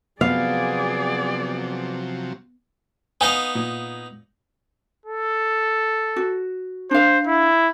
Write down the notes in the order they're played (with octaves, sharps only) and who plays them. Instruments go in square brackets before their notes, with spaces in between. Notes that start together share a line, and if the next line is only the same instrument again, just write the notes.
[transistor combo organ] C3 F3 F#3 [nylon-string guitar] B3 [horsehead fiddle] G#4 D5 [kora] F5
[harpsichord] B3 D#4 F5 [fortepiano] G#5
[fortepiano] A#2
[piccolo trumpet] A4
[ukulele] F#4
[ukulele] D4 F5 [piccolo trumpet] C5
[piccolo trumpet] E4